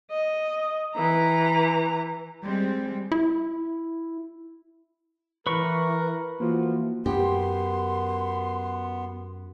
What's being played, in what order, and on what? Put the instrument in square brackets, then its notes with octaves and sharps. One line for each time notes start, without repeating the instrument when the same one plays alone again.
[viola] D#5
E3 A#5
[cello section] G3 G#3 C4
[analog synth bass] E4
[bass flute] E3 [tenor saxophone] A#4 [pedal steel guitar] B4 C#6
[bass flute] E3 [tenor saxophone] F3 [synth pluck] A#3 F#4
[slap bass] F#2 [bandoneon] B3 [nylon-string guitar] G4 [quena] C6